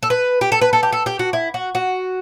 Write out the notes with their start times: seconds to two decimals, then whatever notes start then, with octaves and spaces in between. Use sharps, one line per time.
0.03 A4
0.10 B4
0.41 G4
0.52 A4
0.61 B4
0.73 A4
0.83 G4
0.93 A4
1.06 G4
1.19 F#4
1.33 E4
1.54 F#4
1.75 F#4